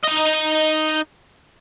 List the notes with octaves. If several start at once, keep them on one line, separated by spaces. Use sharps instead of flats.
D#4 D#5